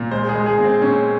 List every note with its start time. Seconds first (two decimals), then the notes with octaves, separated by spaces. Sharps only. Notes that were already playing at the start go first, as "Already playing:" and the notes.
Already playing: A#2
0.11 G#3 C5
0.29 G#4
0.34 G#3
0.46 G#4
0.58 A#2
0.64 C4
0.82 A#2 C#4